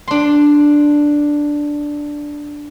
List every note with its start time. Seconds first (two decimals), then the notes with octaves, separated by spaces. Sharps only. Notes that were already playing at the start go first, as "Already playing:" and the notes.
0.08 D4 C6